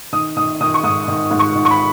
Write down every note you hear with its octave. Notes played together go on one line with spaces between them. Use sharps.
D#3 D#6
D#3 D#6
D#3 D#6
C#6
G#2 D#6
D#3
G#2
C#6
D#3
C#6
B5